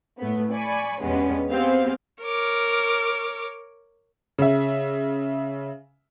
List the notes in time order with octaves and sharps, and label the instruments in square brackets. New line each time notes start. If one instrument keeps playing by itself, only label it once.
[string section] A2 A3 B3
D5 G#5 B5 C#6
E2 G2 G#3 B3 C#4
B3 C4 G4 G#4 C5 F5
[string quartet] A#4 C#5 D6
[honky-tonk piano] C#3 E5